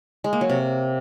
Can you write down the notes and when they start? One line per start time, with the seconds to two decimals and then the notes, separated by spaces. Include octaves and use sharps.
0.24 G#3
0.33 A#3
0.41 F#3
0.50 C3